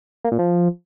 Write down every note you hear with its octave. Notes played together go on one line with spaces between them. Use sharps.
A#3
A#2
F3